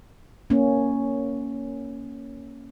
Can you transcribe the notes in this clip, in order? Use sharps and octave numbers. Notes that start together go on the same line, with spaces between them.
A#3 C#4